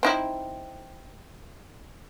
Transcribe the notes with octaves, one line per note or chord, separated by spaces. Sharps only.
C4 D#4 E4